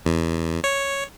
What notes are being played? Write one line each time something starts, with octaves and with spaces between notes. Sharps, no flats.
E2
C#5